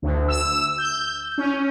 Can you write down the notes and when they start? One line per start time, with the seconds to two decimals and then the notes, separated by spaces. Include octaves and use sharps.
0.02 D2
0.28 E6
0.78 G6
1.38 C#4